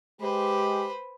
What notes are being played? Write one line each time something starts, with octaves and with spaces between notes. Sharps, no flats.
G#3 G4 B4 C5